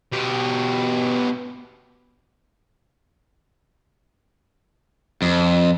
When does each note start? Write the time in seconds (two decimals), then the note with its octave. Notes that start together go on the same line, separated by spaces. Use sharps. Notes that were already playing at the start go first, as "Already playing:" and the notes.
0.12 B2 G4
5.22 F2